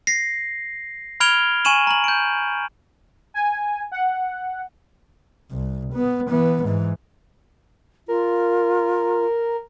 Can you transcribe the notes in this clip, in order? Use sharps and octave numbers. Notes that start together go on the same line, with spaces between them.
A#6 C7
B5 F6 G#6 D7 F7 G7
G#5 C#6 D#7 E7 F#7
A#5 F#7
G6 D7
G#5
F#5
C2
B3
E3 B3
G#2 E3
F4 A#4